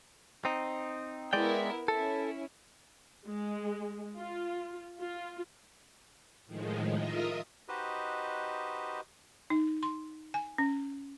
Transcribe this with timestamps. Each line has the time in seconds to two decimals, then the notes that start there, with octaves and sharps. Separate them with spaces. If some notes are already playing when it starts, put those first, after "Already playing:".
0.45 C4 D#4
1.33 G#3 B3 E4 A#4 D5 G5
1.88 C#4 E4 A4
3.27 G#3
4.16 F4
4.99 F4
6.46 A2 D#3 F3 G#3
6.95 F4 A#4 D#5 E5 D#6
7.68 D#4 F#4 G4 B4 C5 D#5
9.50 D#4
9.83 C6
10.34 G#5
10.58 C#4